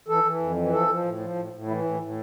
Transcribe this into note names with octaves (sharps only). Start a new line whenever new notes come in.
E3 A4
E3
F2
E3
F3 A4
F3
A2
F3
A2
A2
E3 E4
A2
A2